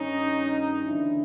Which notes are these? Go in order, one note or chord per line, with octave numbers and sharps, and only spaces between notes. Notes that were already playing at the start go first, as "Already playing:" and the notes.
Already playing: G2 D#3 C#4 D#4
D2 C#3 E3 D4 E4